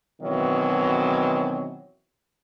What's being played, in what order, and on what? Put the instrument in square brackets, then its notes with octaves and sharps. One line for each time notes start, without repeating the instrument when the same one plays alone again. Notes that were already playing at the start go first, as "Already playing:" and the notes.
[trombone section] B2 D#3 E3 F#3 C4